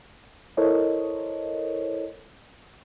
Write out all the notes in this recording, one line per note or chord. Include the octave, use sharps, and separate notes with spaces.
E4 A4 A#4 C5 C#5 D#5